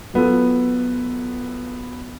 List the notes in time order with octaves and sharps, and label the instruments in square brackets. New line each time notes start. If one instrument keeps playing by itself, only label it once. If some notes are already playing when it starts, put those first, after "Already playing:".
[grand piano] F#3 B3 F4 A4